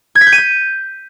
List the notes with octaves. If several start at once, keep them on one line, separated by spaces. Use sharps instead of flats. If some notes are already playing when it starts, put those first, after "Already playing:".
G#6
B6
G6
D#7
G6